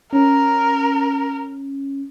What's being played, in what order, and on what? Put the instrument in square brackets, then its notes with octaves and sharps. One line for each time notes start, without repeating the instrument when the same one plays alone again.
[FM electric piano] C#4 [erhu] A#4